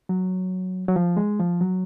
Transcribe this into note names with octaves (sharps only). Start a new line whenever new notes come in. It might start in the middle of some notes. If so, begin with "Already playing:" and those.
F#3
F#3
F3
G#3
F3
F#3